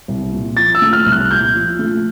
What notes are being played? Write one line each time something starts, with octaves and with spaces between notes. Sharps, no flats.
C2
A#2
F3 A6
E6
A3
F6
C2
F#6
A#2 G6
F3
A3